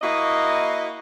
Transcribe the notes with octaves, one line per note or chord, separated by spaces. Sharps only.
A#3 E4 F#4 D#5